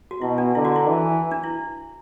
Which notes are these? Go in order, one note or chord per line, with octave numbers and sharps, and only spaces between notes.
F#4
B2 E4
D4
D3 E4
F#4
E4
E3
D4
E4